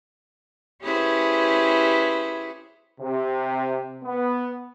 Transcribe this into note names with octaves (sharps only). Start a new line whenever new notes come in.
C#4 E4 G4 G#4 B4 C5
C3
B3